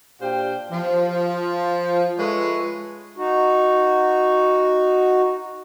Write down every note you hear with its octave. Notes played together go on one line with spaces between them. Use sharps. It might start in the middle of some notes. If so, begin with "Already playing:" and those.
A#2 D4 G4 C5 F5 G5
F3
G#3 F4 A4 B4 C#5 E5
D#4 F#4